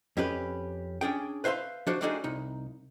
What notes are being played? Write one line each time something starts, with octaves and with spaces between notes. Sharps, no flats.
F2 C#4 G4 B4
C#4 D4 G#4 G5
B4 C5 E5 F5 C6
F3 D4 F#4 C5
G3 A3 D4 D#4 F#4 G#4
C2 D#4